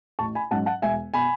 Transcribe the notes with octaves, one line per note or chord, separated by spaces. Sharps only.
A1 A5 C#6
G#5 B5
G#2 F#3 C#4 F#5 A5
F#5 A5
E1 E5 G#5
B2 G#5 B5